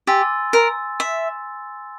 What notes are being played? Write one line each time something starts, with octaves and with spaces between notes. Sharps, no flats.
G4 G#5 C6 E6 A6
A#4
E5